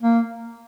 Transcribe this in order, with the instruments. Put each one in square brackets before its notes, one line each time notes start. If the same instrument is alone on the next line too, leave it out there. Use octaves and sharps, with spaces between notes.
[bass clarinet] A#3